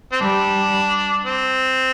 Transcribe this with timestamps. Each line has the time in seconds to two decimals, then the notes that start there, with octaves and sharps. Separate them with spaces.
0.12 C4
0.21 G3 D4
1.24 C4